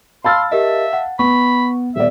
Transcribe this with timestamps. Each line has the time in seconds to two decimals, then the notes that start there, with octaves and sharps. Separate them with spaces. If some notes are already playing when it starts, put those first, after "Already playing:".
0.24 F5 A5 B5 C6 E6 F6 A6
0.52 G4 A#4 D#5 E5
0.93 F#5
1.19 B3 B5 C#6
1.96 D#1 B3 D5 E5